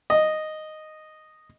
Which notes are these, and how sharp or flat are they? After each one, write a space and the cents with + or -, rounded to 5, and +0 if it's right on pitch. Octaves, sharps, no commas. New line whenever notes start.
D#5 -5